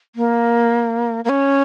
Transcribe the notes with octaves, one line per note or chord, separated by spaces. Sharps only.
A#3
A#3
C#4